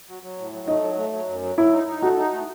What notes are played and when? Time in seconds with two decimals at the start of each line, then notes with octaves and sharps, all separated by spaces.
0.08 F#3
0.23 F#3
0.38 A2
0.52 F#3
0.67 A3 D#4
0.82 F#3
0.97 A3
1.13 F#3
1.28 F#2
1.43 F#3
1.58 F#3 E4
1.73 D#4
1.87 D#4
2.02 A3 F#4
2.18 D#4
2.33 A3